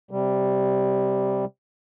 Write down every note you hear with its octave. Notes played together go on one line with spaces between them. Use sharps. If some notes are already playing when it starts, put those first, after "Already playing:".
C3 G3